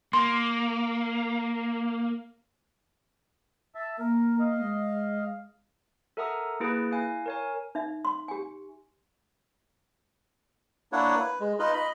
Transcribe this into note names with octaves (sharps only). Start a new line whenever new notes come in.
A#3 C6
E5 A5
A#3 A#4
D#5 F5
G#3
A4 A#4 E5 F#5 A#5 D#6
A#3 E4 G#4 B4
E4 F5 G#5
A#4 C#5 G#5
D#4 E5
C6
G4 G#5
A#3 D4 E4 C#5 F#5
B4
G#3
D#4 F4 B4 D#5
D#5 B5